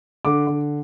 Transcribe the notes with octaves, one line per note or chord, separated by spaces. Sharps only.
D3 D6
D3